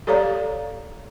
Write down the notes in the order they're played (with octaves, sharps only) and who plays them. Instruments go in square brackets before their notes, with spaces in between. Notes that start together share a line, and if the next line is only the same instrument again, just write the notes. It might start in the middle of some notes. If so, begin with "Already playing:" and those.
[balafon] G4 A4 C#5 D5 F5 A#5